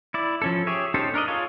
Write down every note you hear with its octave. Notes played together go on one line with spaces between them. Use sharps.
E4 D5
F3 C#4 A4
G4 G#4 C#5 E5
C#4 D#4 G4 A4 C5
D4 A#4 D5 D#5
F4 G#4 A4 C#5 F5